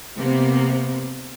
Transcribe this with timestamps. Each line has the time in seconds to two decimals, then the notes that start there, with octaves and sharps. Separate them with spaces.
0.17 C3 A#3 B3